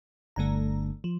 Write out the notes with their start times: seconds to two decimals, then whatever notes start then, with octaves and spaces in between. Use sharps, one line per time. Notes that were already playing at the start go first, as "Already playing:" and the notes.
0.36 G1 G2 D3 A3 A#5
1.04 F3